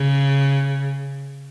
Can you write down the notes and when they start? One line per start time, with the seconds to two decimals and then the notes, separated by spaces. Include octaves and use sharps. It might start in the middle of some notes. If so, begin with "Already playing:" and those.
Already playing: C#3